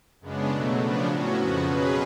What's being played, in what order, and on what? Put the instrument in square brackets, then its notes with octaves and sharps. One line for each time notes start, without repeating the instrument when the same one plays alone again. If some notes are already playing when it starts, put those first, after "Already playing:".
[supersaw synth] F#2 C#3 G#3 B3 D4
B2 F#3 A3 D4
C#3 F3 B3 D4
A2 F#3 C#4 F#4
F2 C#3 F3 B3 F#4
B2 F#3 C#4 G#4 B4